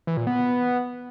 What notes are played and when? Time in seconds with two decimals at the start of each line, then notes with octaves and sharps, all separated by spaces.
0.07 E3
0.17 A#2
0.27 B3